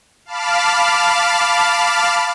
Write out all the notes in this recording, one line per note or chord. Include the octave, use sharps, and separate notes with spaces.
F5 A5 B5 D6 F6